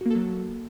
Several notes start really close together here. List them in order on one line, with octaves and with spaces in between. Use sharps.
F#4 A#3 A4 F#3